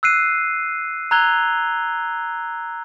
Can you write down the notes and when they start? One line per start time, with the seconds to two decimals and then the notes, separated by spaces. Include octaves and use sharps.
0.03 E6 F#6 C7 D#7
1.11 A#5 E6 F#6 G#6 F7 G7